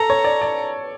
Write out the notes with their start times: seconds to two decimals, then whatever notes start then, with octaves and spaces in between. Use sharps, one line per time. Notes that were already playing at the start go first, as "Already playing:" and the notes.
Already playing: A4 A#5
0.10 C#5
0.24 D5
0.41 D5